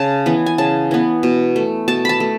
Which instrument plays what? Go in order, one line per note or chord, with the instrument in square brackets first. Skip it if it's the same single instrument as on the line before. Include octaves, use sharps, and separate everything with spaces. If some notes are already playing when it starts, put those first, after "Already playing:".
Already playing: [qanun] C#3 A5
E3 B3
G#5
C#3 A5
E3 B3
B2
A3
B2 A5
A5 B5
A3